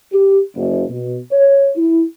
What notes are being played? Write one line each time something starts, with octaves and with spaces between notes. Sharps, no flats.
G4
F#1
B2
C#5
E4